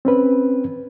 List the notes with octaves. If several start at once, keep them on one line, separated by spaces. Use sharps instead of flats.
C4 C#4 B4